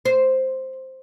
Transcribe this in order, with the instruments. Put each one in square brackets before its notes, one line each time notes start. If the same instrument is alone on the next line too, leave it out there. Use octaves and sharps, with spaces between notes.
[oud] C5